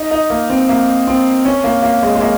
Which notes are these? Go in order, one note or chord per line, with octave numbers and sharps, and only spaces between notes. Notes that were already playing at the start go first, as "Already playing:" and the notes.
Already playing: D#4
D#4
A#3
C4
A#3
C4
C#4
A#3
A#3
G#3
G#3
A#3